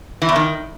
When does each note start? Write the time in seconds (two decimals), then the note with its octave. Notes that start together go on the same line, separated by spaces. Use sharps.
0.22 E3
0.29 E2
0.36 D#3